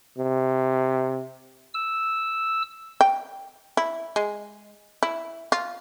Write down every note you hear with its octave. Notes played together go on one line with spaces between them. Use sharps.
C3
E6
G5
E4
G#3
E4
F4